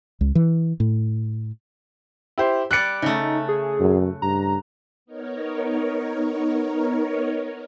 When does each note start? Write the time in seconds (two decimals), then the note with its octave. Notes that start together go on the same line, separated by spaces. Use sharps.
0.21 C#2
0.35 E3
0.80 A2
2.38 E4 G4 C5
2.71 G3 D5 F#6 C#7
3.02 C#3 A3 D#4
3.49 G#4
3.80 F#2
4.22 G2 A#5
5.06 B3 D#4 A#4 C#5